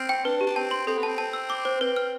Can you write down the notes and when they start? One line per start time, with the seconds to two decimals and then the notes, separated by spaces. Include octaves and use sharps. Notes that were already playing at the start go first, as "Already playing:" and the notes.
Already playing: C4 F6
0.09 G5
0.24 D4 B4
0.41 G4
0.47 D4
0.56 C4 A5
0.71 C6
0.87 C4 A4
0.98 B3
1.03 A5
1.08 C4
1.18 A5
1.33 E6
1.50 D6
1.65 C5
1.81 C4 B4
1.96 F6